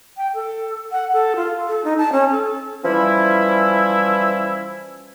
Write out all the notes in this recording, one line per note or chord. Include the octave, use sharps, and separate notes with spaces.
G5
A4
F#5
A4
F4
A4
D#4
A5
C#4
A4
E3 F3 G3 C#4 E4